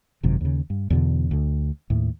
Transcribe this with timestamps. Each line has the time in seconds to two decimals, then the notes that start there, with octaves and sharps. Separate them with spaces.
0.23 G#1 F#2 C3 D#3
0.41 D#2 C#3
0.70 G2
0.90 E2 B2 D3
1.31 D2 D3
1.90 D#2 A2